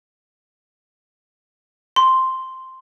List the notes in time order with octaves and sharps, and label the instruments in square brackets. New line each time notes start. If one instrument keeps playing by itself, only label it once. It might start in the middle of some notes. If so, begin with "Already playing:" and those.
[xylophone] C6